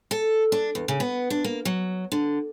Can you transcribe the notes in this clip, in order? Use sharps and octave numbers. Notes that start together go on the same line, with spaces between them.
A4
D4
E2
C#3
B3
D4
A#3
F#3
D3